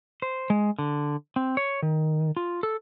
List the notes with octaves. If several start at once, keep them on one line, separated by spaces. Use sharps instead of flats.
C5
G#3
D3
C4
C#5
D#3
F4
A4